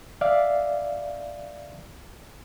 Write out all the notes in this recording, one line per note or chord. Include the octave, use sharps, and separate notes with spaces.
D5 E5 F5